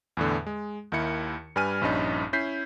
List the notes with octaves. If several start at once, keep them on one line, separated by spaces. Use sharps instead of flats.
E2 A2 D3
G#3
D#2 D#3 E4 C#7
G2 G3 B4 G#5 F6 D#7
A#1 G2 C#4 D#4
C#4 E4 G6 B6 C7